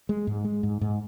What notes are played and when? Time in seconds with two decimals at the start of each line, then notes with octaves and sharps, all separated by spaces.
0.09 G#3
0.27 G#2
0.44 G#3
0.63 G#2
0.81 G#2